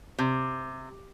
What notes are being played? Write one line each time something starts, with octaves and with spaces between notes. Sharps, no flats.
C3